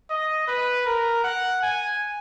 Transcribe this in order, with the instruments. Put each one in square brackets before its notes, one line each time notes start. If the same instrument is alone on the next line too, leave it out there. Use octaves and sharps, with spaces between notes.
[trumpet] D#5
B4
A#4
F#5
G#5